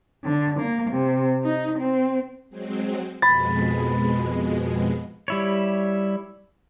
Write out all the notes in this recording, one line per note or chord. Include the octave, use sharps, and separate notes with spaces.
D3
A#3
C3
D#4
C4
F#3 G#3 C4
F2 B2 G#3 B5 A6
G3 E4 C#5